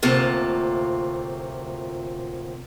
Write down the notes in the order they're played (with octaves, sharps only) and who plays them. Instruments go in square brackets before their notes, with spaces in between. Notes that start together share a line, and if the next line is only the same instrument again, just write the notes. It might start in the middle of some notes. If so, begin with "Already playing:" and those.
[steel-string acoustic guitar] D2 A2 C3 A#3 F4 A5